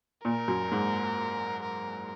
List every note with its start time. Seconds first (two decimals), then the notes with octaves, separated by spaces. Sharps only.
0.25 A#2 A#4
0.48 F#2
0.72 G#2
1.63 A#4